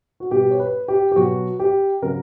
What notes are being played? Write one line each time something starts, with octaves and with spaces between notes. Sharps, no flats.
F#4
B2 G3 G4
C#5
B4
G4
G4
B2 F#3 F#4
G4
C#3 F#3 A#4